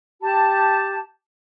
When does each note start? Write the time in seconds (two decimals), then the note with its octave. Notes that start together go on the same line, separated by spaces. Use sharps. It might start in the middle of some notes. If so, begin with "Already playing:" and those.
0.21 G4 A5